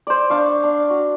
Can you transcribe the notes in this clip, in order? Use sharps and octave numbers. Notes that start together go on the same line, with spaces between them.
C5 D5
D4 F5 C#6
D4
F#4